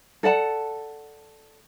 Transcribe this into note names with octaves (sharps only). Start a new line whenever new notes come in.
A4 D5 F#5 A5